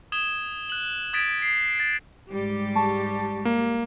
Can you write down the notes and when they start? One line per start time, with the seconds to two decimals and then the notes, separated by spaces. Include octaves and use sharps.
0.12 D#6 G#6 E7 G7
0.70 F#6 F#7
1.13 D#6 G#6 A6 B6 D7
1.42 C7
1.80 A6
2.31 G#2 G3 G4
2.75 G#3 A5 C#6
3.45 A#3